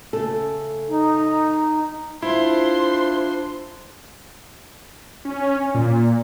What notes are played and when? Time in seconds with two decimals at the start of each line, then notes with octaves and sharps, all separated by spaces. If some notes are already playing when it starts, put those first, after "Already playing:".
0.13 C#3 A3 A4
0.89 D#4
2.22 D4 E4 F4 C5 C6
5.25 C#4
5.75 A#2